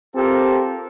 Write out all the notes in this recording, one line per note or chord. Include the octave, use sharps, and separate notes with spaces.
C4 F4 G4 A4 A#4